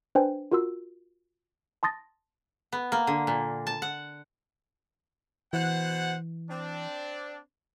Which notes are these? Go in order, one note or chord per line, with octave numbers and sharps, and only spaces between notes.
D4 B4 C5 G5 G#5
F4 F#4 A#4 C6 E6
A5 C6 D#6 A6 A#6
B3
A#3
D3
A#2
A5
F#5
B2 E3 C5 F#5
C4 D4